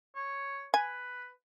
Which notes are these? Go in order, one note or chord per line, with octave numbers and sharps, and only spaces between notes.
C#5
B4 G#5